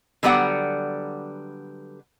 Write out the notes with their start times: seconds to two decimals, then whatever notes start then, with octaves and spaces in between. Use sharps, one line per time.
0.23 D3 F#3 G3 B3 D5 F#5